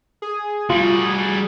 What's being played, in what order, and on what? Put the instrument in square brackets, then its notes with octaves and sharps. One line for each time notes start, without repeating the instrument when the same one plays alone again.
[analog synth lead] G#4
[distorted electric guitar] G3 F#4 [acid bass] F4